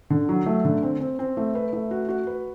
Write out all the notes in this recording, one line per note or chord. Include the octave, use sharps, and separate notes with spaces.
D3
F#3
A3
D3
C4
C4
C4
A3
B4
A3
F#4
F#4
B4